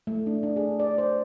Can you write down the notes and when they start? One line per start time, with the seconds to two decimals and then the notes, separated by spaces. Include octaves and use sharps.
0.07 A3
0.26 D4
0.43 D4
0.56 G#4
0.80 D5
0.98 C5